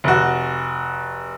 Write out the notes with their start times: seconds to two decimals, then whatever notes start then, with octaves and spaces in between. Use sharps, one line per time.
0.04 F1 F#4